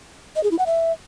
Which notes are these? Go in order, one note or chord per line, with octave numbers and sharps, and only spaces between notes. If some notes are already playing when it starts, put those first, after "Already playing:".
D#5
G#4
E4
F#5
E5